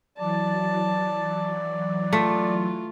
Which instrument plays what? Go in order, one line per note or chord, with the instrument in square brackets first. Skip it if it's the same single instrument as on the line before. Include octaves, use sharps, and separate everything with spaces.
[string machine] E3 F#3 [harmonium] D5 [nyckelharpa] A5
[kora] A3 [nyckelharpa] F4